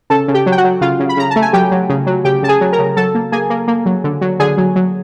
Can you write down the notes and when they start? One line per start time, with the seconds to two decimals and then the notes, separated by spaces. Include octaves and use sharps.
0.10 C#3 A4 A5
0.28 C#3
0.34 G4 G5
0.46 F#3
0.52 G5
0.57 F#4 F#5
0.64 F#3
0.81 C#3 F4 F5
1.00 C#3
1.09 B5
1.17 C#3 A#5
1.30 A5
1.36 A3
1.42 G#5
1.53 F#3 G4 G5
1.71 F#3
1.89 C#3
2.07 F#3
2.24 C#3 G4 G5
2.43 C#3 A5
2.48 G#4 G#5
2.61 F#3
2.72 A#4 A#5
2.79 C#3
2.97 F#3 A4 A5
3.15 A#3
3.32 A#3 G#4 G#5
3.50 A#3
3.68 A#3
3.86 F#3
4.04 D3
4.21 F#3
4.40 D3 G#4 G#5
4.58 F#3
4.76 F#3